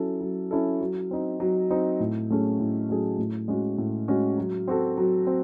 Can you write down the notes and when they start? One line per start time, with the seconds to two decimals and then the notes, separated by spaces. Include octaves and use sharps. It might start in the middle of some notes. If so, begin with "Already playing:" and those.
Already playing: F#3 C#4 E4 A4
0.21 F#3
0.51 C#4 E4 A4
0.81 F#3
1.11 C4 D#4
1.40 F#3
1.71 C4 D#4
2.00 A2
2.30 F#3 A3 C#4 G#4
2.60 A2
2.89 F#3 A3 C#4 G#4
3.18 A2
3.48 G#3 C#4 F#4
3.78 A2
4.08 G#3 C#4 F#4
4.38 F#3
4.68 C4 F#4 A4
4.98 F#3
5.27 C4